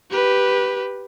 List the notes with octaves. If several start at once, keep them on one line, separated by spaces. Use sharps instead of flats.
G4 B4